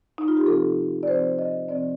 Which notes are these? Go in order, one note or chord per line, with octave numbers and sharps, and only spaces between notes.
D#4
F4
G4
C3 F3 C4 A4
D5
C3 F3 C4 C5
D#5
C3 F3 C4 D5